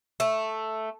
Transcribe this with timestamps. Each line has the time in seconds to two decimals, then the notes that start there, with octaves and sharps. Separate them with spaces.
0.20 A3